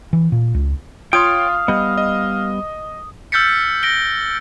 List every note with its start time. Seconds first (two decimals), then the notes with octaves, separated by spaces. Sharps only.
0.13 E3
0.32 A#2
0.54 C#2
1.13 F4 C#5 F5 G5 C6 D#6
1.68 G3 B3 D#5
1.98 D#5
3.32 E6 F6 G6 A6 B6 C#7
3.83 A#6 D7 G7